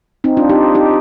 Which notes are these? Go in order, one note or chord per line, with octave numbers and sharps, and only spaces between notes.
C4 D#4
D4 F4
D#4 G4
D#4 G4